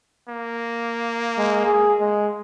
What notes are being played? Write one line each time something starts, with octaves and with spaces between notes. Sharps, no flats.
A#3
G#3
G#4
G#3